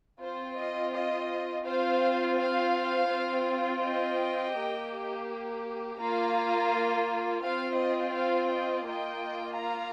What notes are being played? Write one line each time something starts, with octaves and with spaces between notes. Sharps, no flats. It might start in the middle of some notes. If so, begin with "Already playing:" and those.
C4 F4 C5
D#5
D#5
C4 F4 C5 F5
C5 F5
C4 F4
D#5 G5
A#3 G4
A#3 F4 F5 A#5
C4 F4 C5 F5
D#5
C5 F5
D#5 G5
A#3 F4 D#5 G5
F5 A#5